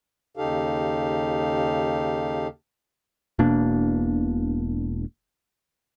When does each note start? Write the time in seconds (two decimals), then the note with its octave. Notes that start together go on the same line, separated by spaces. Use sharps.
0.37 D#2 C#3 D#4 G4 A4 F5
3.39 E1 B2 A#3 D4